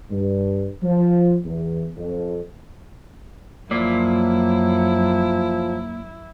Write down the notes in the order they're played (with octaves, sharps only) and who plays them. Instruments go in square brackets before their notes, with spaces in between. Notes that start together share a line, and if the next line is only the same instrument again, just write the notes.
[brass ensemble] G2
F3
E2
F2
[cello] F#2 [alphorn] F3 [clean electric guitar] A#3 D5 [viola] E4